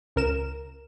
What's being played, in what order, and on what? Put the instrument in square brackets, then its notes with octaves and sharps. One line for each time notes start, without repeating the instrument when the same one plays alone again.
[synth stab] C#2 A#4 E7